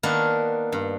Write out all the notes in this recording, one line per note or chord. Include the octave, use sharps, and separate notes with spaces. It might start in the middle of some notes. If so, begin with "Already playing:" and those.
D#3 A#3 B3 D4
G2